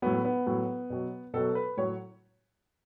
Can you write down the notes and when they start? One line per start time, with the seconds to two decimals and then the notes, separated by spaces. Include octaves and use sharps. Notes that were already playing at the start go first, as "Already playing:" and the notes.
0.02 A2 F#3 B3
0.25 B3
0.47 A2 F#3
0.90 B2 F#3
1.34 B2 F#3 A4
1.55 B4
1.77 A2 F#3 C#5